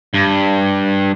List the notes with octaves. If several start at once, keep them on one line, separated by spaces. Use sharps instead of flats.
G2